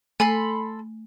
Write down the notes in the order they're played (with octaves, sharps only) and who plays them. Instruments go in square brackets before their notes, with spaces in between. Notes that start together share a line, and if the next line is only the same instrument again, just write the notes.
[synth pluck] A3 [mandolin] A4 B5 C6 [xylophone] G#5